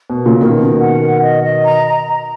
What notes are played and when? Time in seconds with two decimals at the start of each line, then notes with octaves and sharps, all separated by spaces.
0.10 B2
0.15 A#4
0.26 A#2 C#3
0.37 B2 D#3 A#4
0.58 A#4
0.79 F#5
1.01 A#4
1.21 D#5
1.44 D#5
1.64 A#5
1.86 A#5
2.07 A#5